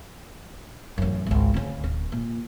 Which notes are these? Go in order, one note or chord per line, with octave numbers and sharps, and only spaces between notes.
A1 F#2
G#1 C#2
D2 C#3
D1
A#2